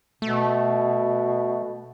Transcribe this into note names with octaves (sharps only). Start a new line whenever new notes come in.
B2 A3